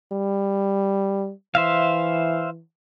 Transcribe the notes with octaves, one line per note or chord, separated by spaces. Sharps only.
G3
E3 C5 E5 F5